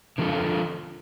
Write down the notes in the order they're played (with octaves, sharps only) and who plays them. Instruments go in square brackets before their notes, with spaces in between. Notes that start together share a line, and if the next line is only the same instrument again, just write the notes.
[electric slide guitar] D3 F3 A#3 F4 A4